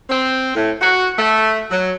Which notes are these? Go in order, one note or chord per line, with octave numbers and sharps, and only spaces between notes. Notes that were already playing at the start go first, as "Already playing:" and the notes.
C4
A2
F#4
A3
F#3